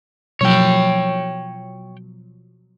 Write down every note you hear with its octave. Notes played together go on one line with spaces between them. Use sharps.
B2 F3 F#3 C#5 G5